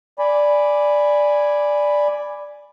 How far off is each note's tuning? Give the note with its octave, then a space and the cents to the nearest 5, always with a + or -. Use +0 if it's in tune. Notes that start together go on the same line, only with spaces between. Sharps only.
D5 +0 G#5 +0 B5 +0